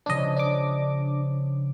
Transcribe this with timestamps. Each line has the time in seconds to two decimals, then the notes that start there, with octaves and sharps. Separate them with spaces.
0.06 C#3 F3 C#4 D4 D#5
0.36 D4 D6